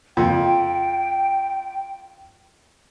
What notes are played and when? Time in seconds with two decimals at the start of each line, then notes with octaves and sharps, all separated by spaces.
0.17 F2 G5